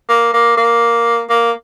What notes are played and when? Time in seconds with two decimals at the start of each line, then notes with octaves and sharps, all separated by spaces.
0.09 A#3
0.34 A#3
0.57 A#3
1.29 A#3